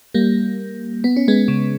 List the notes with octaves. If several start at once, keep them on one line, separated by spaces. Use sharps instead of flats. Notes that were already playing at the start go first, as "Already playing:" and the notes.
G3 A#3
B3
C#4
G#3 B3
C#3